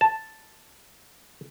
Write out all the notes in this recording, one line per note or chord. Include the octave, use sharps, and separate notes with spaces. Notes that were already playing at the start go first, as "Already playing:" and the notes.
A5